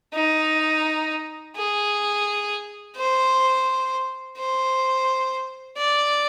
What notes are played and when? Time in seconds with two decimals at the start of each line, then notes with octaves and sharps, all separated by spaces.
0.14 D#4
1.56 G#4
2.96 C5
4.37 C5
5.77 D5